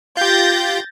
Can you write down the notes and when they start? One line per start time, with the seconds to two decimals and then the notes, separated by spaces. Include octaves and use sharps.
0.17 F4 G4 G6 A6 A#6